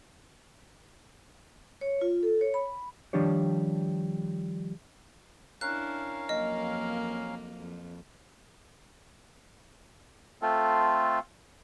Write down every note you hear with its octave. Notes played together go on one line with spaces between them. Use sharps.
C#5
F4
A4
C#5
B5
D#3 F3 G3 D4 G4 C#5
C#4 D4 E4 A#4 F5 F#6
F2 F#3 A#3 D#5
F2
A3 C4 F4 A4